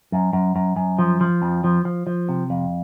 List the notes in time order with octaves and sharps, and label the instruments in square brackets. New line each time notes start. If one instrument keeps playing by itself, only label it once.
[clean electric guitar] F#2
F#2
F#2
F#2
F3
F3
F2
F3
F3
F3
C3
F2